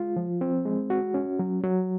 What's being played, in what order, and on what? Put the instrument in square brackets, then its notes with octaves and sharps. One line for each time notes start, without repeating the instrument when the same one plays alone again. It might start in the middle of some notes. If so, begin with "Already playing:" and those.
Already playing: [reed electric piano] G#3 F4
F3
C4
G#3
F#4
C#4
F#3
F#3